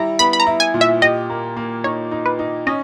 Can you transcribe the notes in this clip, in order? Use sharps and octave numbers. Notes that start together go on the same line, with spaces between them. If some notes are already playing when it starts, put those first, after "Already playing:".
Already playing: G3 E4 A#5
B3 B5
B5
A#5
E4
G#5
A#2
E5
G4 D#5
A#3
A#3
D#4 C#5
D#4
B4
D#4
C#4 D#5